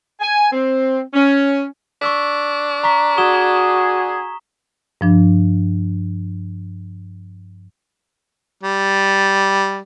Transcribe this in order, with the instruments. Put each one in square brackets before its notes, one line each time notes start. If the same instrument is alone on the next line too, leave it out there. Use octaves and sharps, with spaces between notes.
[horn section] G#5
C4
C#4
[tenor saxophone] D4 [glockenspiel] C#6 E6 B6
[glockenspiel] A#5 C#6 B6
[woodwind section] F#4 G#4 [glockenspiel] D#6 E7 G7
[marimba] G2 F3 D4
[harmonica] G3